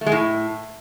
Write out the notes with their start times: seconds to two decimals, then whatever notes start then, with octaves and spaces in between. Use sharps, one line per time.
0.01 A3
0.06 G#3
0.12 A2